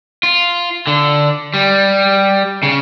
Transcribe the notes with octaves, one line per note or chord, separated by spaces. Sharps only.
F4
D3
G3
C#3